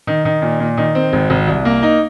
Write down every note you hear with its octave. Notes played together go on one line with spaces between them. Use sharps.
D#3
D#3
A#2
A#2
D#3
C4
G#1
G#1
C2
A#3
D#4